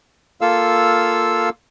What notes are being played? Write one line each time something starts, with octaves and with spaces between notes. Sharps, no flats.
A#3 F4 A4 F5 E6